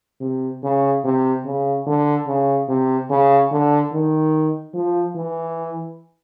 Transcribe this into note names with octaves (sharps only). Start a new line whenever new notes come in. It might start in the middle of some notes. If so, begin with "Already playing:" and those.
C3
C#3
C3
C#3
D3
C#3
C3
C#3
D3
D#3
F3
E3